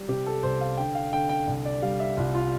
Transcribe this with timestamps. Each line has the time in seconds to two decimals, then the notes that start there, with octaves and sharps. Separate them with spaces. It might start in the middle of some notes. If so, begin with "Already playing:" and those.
Already playing: G3
0.08 C3 G4
0.26 A4
0.43 C2 C5
0.61 F5
0.77 D3 G5
0.95 F5
1.13 D3 G5
1.29 G5
1.47 C2
1.65 D5
1.82 G3 F5
2.00 E5
2.17 C2 F4
2.35 F4